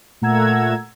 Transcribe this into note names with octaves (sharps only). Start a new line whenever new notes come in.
A#2 A3 F#5 A#5 E6 G#6